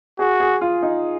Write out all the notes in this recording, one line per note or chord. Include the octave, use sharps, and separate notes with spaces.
F#4 G#4
G#4
F4
D#4